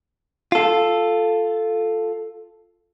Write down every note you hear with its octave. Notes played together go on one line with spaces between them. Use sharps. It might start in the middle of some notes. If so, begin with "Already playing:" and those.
F4 A4